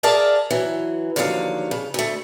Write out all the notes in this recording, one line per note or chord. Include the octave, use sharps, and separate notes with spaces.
G#4 A#4 D5 E5 F5 A5
E3 F#3
D#2 D3 F3 F#3 A4 F5
C#3
D2 A3